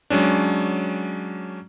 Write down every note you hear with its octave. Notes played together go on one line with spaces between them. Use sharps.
F#3 G#3 C#4 D4